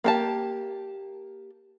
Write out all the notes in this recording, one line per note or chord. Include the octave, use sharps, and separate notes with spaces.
A#3 G4 A5